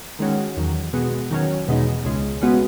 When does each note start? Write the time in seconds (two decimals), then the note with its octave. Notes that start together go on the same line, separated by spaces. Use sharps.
0.19 D#3 G#3 C#4 F#4
0.57 E2 D#3 F#3
0.93 B2 G#3 B3 F#4
1.31 D#3 F#3 C#4
1.68 E2 B2 G#3 D#4
2.05 C#2 C#3 G#3
2.41 C#3 G#3 B3 F#4